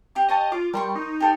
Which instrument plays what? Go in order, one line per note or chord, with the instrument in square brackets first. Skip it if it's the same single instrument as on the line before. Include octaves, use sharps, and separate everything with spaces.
[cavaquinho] G4 F5 D6
[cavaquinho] G4 C#5 A5 [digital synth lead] D#5
[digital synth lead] F4 [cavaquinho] D6
[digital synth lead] G3 [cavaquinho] A#4 C6 C#6
[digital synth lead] D#4
[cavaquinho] G4 A4 D5